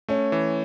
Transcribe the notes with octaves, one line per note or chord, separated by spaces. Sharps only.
A3 C#4
E3